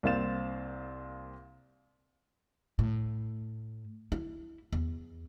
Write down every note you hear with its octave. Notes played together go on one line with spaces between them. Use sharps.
C2 A#3 C4 F5 A6 E7
A2
E4
E2